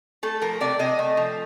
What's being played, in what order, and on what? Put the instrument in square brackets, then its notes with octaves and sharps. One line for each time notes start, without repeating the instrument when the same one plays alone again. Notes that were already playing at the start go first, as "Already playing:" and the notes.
[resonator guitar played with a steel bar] A3 A4
F3 A#4
C3 D5
C3 D#5
A3
F3